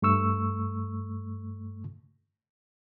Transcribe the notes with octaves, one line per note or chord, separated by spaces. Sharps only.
G2 A3 C#6 E6